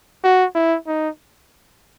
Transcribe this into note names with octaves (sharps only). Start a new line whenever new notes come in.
F#4
E4
D#4